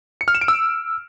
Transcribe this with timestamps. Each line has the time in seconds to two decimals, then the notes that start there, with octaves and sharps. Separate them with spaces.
0.21 C#7
0.28 F6
0.35 E7
0.41 D7
0.48 E6